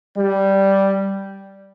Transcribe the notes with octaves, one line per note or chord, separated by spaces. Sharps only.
G3